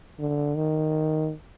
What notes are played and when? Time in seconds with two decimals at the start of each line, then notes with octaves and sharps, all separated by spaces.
0.19 D3
0.56 D#3